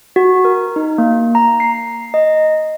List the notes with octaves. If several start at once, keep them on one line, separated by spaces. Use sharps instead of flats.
F#4
A#4
D#4
A#3
A#5
C7
D#5